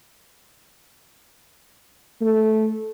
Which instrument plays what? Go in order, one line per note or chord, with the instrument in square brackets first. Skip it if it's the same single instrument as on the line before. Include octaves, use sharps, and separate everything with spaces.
[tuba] A3